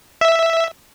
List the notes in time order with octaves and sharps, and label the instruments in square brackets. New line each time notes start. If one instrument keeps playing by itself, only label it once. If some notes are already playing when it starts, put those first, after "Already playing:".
[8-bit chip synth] E5